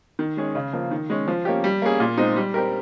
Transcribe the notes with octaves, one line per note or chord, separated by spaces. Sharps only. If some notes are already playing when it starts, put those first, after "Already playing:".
D#3
G#3 C#4 G#4
C#3
F3 A#3
D#3
G#3 C#4
F3
A#3 C#4 G4
G3
A#3 C#4 G#4
A#2
G#3 C4 D#4
G3
C4 G4 A#4